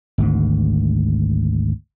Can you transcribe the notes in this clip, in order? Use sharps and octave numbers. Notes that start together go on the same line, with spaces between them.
G#1 D2 G#2